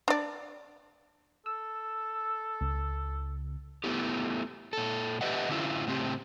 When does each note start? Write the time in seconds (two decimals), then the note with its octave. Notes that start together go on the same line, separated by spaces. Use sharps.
0.08 D4 D5
1.46 A4 E6
2.61 C#2
3.84 A3 B3 E4 G4
4.73 A#2 A4
5.21 G4 G#4 B4 D#5 E5 F#5
5.49 D3 C#4 E4 F4
5.87 A2 C#3 C4 G4